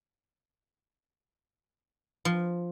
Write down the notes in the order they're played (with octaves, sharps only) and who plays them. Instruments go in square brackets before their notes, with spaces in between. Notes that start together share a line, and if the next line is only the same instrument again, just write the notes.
[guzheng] F3